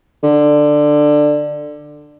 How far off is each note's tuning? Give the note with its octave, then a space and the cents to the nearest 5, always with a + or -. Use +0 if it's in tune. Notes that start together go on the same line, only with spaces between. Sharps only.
D3 +15